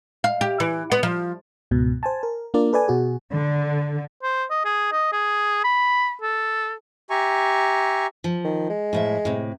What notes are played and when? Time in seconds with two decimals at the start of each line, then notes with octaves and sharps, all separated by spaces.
0.24 F5
0.41 G4
0.60 E3
0.92 B3
1.03 F3
1.71 C#2 G#2 B2
2.03 C5 G#5 A5
2.23 A#4
2.54 A#3 D4 F4 A#4 D5
2.73 A4 B4 D5 G#5
2.88 B2 F#4 G#4
3.33 D3
4.23 C5
4.50 D#5
4.65 G#4
4.92 D#5
5.12 G#4
5.64 B5
6.22 A4
7.10 G4 E5 G#5 A#5 C#6
8.24 F3
8.44 D#3
8.70 G#3
8.93 A2 F3 E5
9.25 A2 C3